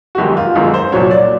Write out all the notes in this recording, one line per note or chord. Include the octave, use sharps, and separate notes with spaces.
F#4
G1 F#2 D#3 G#3 G4
F4
G1 F#2 D#3 G#3
C5
C2 A#2 F#3 C#5
D5